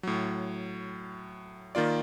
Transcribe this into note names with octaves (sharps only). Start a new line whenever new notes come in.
A2 F#3
D#3 A#3 F4 D5